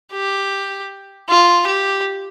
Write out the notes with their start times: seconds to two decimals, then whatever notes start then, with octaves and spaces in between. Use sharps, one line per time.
0.12 G4
1.29 F4
1.67 G4